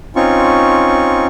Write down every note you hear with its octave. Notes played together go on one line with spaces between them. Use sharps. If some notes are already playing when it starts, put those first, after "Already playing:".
C4 C#4 D#4 F4 C#6